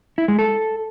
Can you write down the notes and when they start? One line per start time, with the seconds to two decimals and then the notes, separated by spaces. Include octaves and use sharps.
0.18 E4
0.28 G#3
0.39 A4